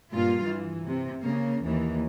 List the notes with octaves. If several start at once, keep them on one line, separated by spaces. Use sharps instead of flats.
G2 A#2 F4 F5
E3
C3
C#3 A#3
D#2 E3